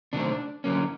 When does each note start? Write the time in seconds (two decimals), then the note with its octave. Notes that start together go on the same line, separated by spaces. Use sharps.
0.13 C3 D#3 F#3 A3 C4 D4
0.64 D3 F#3 A#3 C#4